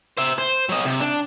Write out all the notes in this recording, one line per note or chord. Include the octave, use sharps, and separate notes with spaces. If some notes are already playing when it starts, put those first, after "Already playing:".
C5 E5
C5
F#3 D#5
C3
D4